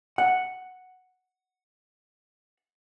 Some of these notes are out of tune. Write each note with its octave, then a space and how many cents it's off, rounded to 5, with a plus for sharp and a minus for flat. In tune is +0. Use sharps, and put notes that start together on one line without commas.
F#5 +0